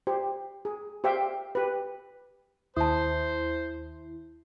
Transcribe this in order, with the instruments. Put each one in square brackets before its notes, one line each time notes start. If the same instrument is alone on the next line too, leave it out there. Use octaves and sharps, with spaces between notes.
[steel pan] G4 C5
G#4
G4 C5 E5 F5 G5
G4 B4
[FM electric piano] D#2 E4 [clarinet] C5 [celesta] A5 D#6